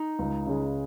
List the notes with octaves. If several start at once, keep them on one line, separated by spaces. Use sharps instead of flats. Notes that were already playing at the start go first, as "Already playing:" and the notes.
Already playing: D#4
C#2
C#3 G#3